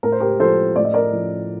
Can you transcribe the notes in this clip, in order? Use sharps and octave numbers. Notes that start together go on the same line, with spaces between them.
A2 A#4
C5
G4 A#4
F3 A4 C5
A2 D5
D#5
A#4 D5
F3